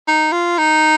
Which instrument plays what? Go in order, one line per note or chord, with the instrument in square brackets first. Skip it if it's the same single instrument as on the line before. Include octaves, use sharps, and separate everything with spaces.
[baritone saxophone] D#4
F4
D#4